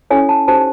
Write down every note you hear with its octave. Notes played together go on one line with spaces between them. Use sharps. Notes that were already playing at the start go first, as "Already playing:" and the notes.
C#4 E4 A4 C#5 G#5
A5
D#4 G4 C5 A5